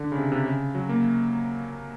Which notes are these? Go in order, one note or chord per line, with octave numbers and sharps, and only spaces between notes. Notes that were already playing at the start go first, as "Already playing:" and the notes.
Already playing: D3
C#3
C3
C3
C#3
F#3
A#3